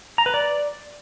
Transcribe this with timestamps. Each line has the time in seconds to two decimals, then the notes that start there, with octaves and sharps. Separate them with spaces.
0.18 A#5
0.26 B4
0.34 D5